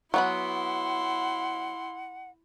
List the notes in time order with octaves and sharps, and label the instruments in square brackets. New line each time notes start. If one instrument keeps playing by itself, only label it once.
[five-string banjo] F#3 B3 B5 [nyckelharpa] E4 C6 [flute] F#5